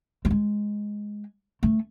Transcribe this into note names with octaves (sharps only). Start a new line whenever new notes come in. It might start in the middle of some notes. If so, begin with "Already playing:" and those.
A3
G#3
A3